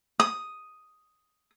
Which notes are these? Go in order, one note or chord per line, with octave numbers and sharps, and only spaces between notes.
D#6